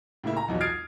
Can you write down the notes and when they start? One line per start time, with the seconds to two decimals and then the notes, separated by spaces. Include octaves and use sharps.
0.24 A2 C#3 A#3 E4
0.37 A#5
0.48 B1 E2 F3 F#3
0.61 D#6 F6 G#6 A6 C7 D7